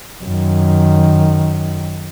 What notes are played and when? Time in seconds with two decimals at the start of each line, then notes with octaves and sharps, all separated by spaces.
0.25 F#2 D#3